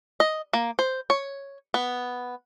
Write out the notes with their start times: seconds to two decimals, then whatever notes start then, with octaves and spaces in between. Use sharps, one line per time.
0.20 D#5
0.53 A#3
0.79 C5
1.10 C#5
1.74 B3